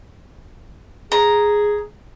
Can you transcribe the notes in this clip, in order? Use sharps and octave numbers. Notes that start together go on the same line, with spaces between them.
G#4 A#5